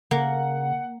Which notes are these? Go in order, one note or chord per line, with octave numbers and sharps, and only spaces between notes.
C#3 A#3 F#5